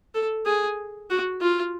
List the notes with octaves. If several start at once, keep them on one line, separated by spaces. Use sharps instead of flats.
A4
G#4
F#4
F4